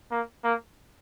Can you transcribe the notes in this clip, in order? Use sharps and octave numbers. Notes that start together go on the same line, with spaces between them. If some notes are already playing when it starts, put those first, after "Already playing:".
A#3
A#3